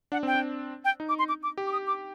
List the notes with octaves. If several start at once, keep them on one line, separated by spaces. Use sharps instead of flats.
D4 F#5
C4 G5
D4
G5
D#4
D6
C6
D6
D6
G4
D6
D#6
D6